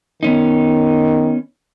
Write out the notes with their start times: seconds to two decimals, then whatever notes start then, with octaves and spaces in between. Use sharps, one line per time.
0.23 D#3 B3 C#4 D#4